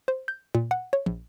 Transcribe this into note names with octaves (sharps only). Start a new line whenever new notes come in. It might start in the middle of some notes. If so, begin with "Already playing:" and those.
C5
G6
A#2
F#5
C#5
A#1